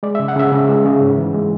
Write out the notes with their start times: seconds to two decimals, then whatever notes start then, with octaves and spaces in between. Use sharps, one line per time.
0.03 G#3 D5
0.15 E5
0.19 C#3
0.28 F#5
0.36 C#3 E5
0.52 C#3
0.69 G#3
0.85 C#3
1.01 G#2
1.17 E3
1.34 G#3